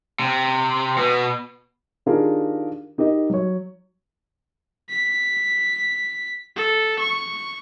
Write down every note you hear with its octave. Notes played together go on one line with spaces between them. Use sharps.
C3
B2
D#3 D4 F4 G4 G#4 A#4
D#4 G4 A#4 D#5
F#3 C#5
B6
A4
C#6